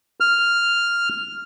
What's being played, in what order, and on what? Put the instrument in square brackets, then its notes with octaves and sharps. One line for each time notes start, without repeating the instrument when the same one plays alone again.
[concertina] F6